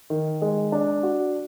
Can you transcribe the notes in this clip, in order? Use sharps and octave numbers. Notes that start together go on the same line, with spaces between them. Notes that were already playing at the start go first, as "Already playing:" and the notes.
D#3
G#3
D4
F#4